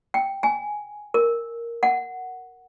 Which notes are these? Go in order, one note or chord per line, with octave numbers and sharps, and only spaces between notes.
G5
G#5
A#4
F#5